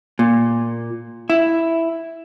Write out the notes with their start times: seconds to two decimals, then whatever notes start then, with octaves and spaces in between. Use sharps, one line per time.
0.19 A#2
1.30 E4